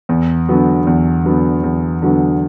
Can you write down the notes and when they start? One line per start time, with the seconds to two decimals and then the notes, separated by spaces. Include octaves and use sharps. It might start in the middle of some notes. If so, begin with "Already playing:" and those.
0.09 E2
0.49 D3 F#3 B3
0.87 E2
1.24 D3 F#3 B3
1.64 E2
2.02 D3 F#3 B3